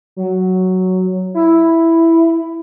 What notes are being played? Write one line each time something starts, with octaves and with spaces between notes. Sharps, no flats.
F#3
E4